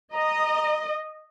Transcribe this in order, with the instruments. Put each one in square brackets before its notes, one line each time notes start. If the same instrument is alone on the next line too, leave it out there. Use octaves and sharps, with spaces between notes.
[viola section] D#5 [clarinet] A#5